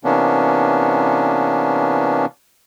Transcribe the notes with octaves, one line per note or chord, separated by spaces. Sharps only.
C3 E3 A#3 B3 C#4 D4